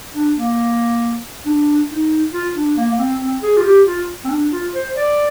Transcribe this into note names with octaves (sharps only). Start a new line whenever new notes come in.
D4
A#3
D4
D#4
F4
D4
A#3
A#3
C4
C4
G#4
F4
G4
F4
C4
D4
F4
C5
D5